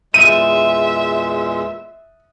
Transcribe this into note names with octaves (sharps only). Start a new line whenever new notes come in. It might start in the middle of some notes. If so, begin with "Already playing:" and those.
E2 A#2 G#3 E5 D#7